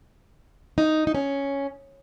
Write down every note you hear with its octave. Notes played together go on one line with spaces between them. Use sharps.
D#4
D#4
C#4